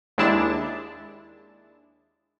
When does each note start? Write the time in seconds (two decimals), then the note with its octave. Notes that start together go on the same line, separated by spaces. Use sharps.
0.18 D#2 G#3 D4 E4 A5